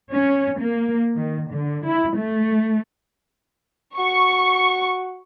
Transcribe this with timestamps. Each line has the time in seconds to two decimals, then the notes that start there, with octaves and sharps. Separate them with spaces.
0.10 C#4
0.60 A#3
1.16 D#3
1.52 D3
1.85 E4
2.16 A3
3.98 F#4 C#6